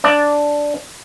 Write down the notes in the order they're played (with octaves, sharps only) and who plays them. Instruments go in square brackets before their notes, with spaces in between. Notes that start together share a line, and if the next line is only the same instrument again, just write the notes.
[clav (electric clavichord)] D4 D5